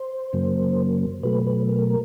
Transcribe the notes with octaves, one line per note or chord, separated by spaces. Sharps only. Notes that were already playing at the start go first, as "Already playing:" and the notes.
Already playing: C5
F#2 C#3 F#3 A#3
B2 F#3 A3 B4
B4
A#4